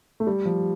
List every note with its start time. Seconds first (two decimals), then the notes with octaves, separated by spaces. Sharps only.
0.20 A3
0.27 G3
0.45 F3